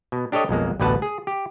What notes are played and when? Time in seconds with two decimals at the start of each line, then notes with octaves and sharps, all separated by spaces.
0.12 B2
0.32 D4 G4 A4 C#5 D#5
0.49 B1 F2 G#3 A#3
0.80 A1 D2 B2 B4 F#5 A5
1.02 G#4
1.27 G4